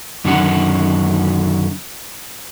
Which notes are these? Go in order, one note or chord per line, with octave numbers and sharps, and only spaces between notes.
F#2 D3 D#3 F#3 C#4 F#4